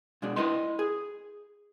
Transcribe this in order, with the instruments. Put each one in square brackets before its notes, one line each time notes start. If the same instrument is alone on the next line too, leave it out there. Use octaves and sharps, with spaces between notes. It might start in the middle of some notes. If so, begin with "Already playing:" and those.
[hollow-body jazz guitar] B2 G#3 D4
E4 B4 D#5 C6
G#4